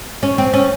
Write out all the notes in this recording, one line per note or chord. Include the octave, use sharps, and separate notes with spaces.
C#4
C4
C#4